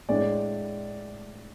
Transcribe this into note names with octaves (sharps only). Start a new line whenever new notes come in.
A2 G#3 D4 D5